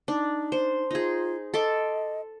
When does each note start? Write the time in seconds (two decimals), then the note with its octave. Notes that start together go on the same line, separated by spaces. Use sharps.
0.08 D4 D#4
0.52 C5
0.91 D#4 F4 G#4
1.54 A4 D#5 C6 D6